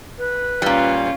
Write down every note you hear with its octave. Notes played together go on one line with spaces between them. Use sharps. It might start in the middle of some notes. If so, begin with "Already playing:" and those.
B4
A#2 G3 C#4 F4